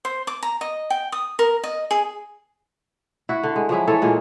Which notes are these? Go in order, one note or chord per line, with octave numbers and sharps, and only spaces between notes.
C5
D6
A#5
D#5
G5
D#6
A#4
D#5
G#4
E4 F#4
D3
G#3
F3 F#3 G#3 E4
E3 A4 C#5
A#2 G#3 A#3